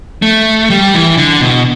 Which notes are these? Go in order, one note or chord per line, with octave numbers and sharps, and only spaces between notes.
A3
G3
E3
D3
B2